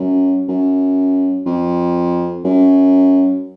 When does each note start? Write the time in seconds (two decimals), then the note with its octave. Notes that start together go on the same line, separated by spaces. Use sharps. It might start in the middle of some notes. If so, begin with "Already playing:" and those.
Already playing: F#2
0.48 F#2
1.46 F2
2.44 F#2